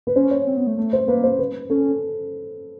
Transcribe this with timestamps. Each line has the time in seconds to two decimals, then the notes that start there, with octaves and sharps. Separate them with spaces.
0.07 B4
0.16 C#4 C5
0.31 C#5
0.47 C4
0.57 B3
0.67 A3
0.77 A3
0.93 C5
1.08 A#3 B4
1.24 C5
1.39 B4
1.70 C#4 A4